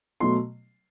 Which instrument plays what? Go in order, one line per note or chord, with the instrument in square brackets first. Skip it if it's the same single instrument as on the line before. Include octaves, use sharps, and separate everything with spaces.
[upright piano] B2 F#3 A3 C6